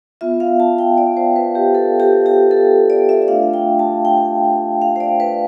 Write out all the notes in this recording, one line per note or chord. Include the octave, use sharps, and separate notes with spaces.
B3 F4 E5
F5
A5
G5
D5
C5
B4
G4
A4
G4
G4
A4
D5
E5
E5
A3 D4 F4 F5
G5
A5
G5
F5
C5
D5
B4